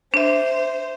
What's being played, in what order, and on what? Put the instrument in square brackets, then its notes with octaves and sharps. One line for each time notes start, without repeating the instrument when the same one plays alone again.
[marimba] D4 E5 [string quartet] C5